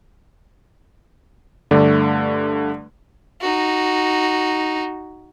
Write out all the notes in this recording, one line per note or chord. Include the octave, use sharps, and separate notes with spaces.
G2 D3 A3 D5
D#4 F#4